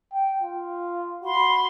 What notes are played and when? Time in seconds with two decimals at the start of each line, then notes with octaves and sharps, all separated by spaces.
0.13 G5
0.42 F4
1.23 F#4 B5 C6